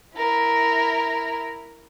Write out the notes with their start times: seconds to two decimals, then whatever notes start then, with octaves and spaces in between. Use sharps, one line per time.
0.15 E4 A#4